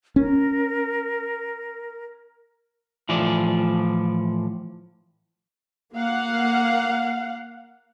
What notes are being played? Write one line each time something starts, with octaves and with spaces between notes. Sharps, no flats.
C#4 A#4
A2 E3 F3 D5
A#3 F5 F#5